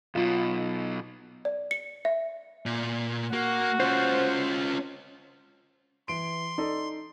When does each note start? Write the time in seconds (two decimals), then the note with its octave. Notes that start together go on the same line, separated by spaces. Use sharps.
0.15 B1 B2 F4
1.45 D5
1.71 C#7
2.05 E5
2.66 A#2
3.33 A#3 F#4
3.80 C#4 F4 C5
6.08 E3 C6 D7
6.58 D#4 A4 D5